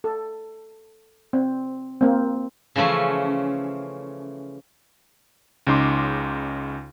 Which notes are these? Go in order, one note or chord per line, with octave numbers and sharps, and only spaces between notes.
A4
C4
A#3 C4
C#3 E3 F3 A3 C#4
C#2 C#3 D#4 C6 D6